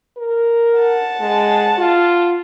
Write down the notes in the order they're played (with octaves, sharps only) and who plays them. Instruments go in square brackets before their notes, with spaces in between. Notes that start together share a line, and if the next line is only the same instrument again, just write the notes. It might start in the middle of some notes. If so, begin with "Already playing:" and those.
[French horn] A#4
[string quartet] F#5 A5
[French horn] G#3
F4